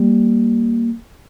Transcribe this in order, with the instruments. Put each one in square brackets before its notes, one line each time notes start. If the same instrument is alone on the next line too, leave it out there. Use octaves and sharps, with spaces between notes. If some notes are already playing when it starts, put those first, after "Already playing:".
Already playing: [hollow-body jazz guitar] G3 A#3